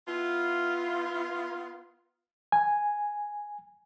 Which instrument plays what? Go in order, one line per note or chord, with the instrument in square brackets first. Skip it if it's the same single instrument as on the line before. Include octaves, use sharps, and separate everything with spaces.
[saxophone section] B3 E4 F4
[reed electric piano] G#5